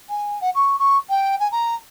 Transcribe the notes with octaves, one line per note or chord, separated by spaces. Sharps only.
G#5
F#5
C#6
C#6
G5
G#5
A#5